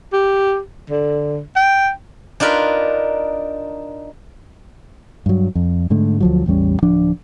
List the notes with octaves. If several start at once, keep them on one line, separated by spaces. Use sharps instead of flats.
G4
D3
G5
D4 D#4 F4 A#4 B4
G2 F#3
F2
G#2 D3 A3
D2 F3 F#3
A1 E2 G3 C#4
D1 F3 D4